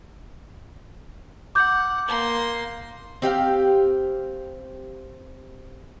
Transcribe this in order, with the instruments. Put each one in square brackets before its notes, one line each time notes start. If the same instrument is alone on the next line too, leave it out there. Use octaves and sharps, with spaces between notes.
[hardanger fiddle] F#5 [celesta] D6 G6
[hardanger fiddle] A#3 C6
[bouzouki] C4 G4 F5 G5